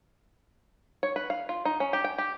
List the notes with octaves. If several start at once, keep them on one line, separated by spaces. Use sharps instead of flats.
C#5
B4
F5
F4
D#4
C#4
G4
G5
G4